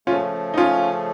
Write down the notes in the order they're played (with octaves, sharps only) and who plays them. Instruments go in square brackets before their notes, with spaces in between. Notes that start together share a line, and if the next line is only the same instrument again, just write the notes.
[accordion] C#3 F3 A3 [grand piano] C#4 F4
[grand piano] D#4
C#4 F4